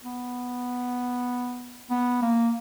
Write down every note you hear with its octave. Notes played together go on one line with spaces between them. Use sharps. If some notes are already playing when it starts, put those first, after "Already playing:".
B3
B3
A#3